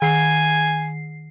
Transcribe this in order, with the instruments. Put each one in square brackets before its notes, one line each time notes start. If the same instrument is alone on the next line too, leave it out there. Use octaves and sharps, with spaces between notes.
[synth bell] D#3 C7 [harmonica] G#5